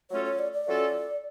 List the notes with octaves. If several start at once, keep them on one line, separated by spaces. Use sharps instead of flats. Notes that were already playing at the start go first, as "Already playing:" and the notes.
F#3 A3 C#4 F4 A4 C#5
C#5
D5
D5
F#3 A3 C#4 F4 A4